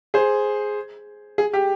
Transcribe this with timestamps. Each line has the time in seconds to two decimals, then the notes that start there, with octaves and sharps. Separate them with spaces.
0.14 G#4 C5
1.38 G#4
1.53 G4